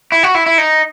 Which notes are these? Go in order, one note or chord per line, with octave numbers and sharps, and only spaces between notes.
E4
F#4
E4
E4
D#4